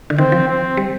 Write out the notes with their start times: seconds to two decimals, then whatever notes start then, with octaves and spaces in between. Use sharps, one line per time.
0.10 D3
0.18 D#3 C4
0.32 F3
0.48 C4
0.77 G3